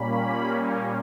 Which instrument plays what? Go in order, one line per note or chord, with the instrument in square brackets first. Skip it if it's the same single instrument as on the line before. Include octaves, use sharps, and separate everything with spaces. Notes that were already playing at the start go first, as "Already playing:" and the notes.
Already playing: [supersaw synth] A#2 G3 A#3 C#4 B5